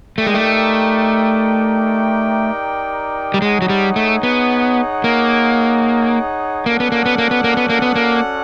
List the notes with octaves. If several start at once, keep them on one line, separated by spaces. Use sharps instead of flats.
A3 D#4 G4 A#4 D5 G5
G#3
A3
G3
G#3 D#4 G#4 C#5 F#5
F#3
G3
A3
B3
A#3
A#3 C#4 F#4 A4 D5 F#5
B3
A#3
B3
A#3
B3
A#3
B3
A#3
B3
A#3